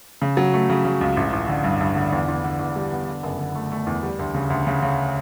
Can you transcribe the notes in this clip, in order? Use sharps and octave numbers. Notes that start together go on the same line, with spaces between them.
C#3
F#3
A3
C#3
C#3
C#2
A1
A1
D3
G2
G2
D3
E2
E2
D3
E2
G3
B3
D3
F#1
D3
A3
A3
E2
G3
D2
C#3
D2
C#3
C#3